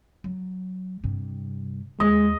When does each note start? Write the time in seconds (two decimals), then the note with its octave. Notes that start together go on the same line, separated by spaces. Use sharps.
0.24 F#3
1.04 G2 C3
2.00 D#2 G#3 F4 D#5